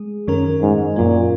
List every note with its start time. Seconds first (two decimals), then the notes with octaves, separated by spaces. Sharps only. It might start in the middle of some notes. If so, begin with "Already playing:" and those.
Already playing: G#3 G#4
0.27 F#2 D#3 F#3 C#4 A#4
0.62 G#2
0.96 F#2 A#2 F#3 C#4